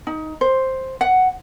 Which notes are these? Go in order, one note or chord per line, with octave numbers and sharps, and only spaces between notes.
D#4
C5
F#5